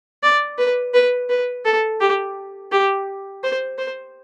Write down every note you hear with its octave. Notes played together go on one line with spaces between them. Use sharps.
D5
B4
B4
B4
A4
G4
G4
C5
C5